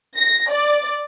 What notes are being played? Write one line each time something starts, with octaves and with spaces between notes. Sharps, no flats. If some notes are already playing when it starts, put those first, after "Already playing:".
A#6
D5